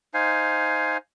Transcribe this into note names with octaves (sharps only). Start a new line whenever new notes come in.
D#4 C5 F5 G#5